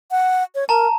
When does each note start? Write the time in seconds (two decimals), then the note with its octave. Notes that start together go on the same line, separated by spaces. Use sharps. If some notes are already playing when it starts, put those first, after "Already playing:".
0.11 F#5
0.55 C#5
0.69 A#4 A5 A#5